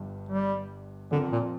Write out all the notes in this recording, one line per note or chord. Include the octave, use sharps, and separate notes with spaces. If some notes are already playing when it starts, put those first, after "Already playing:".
Already playing: G1 G2 D4
G3
F2 D3 F3 C4 A#4
A#2